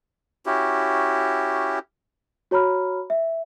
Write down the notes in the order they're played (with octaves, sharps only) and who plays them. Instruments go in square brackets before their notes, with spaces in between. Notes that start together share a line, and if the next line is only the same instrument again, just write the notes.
[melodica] C#4 E4 F#4 G4
[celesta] F#4 C#5 A#5 B5 F6
E5